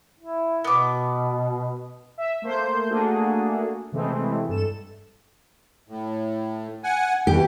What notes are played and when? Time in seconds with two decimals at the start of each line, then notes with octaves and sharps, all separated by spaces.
0.20 E4
0.64 B2 B3 D6
2.18 E5
2.42 A3 A#3 C5 G6
2.89 A3 A#3 D4 F#4 G#4 A4
3.92 C3 E3 G#3 A3 C4
4.49 G2 A4 E7
5.88 A2
6.84 F#5 G#5
7.27 B2 E3 G4